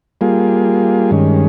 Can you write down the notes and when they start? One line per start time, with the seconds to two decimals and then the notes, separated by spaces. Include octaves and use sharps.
0.21 G3 A#3 F4 G#4
1.11 G2 D#3 G#3 C#4